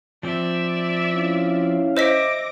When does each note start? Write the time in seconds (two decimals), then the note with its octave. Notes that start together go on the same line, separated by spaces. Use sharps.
0.23 F3 C4 D5 E5
1.12 C#4 E4 F5
1.97 C5 D#5 E5 D6 A#6 B6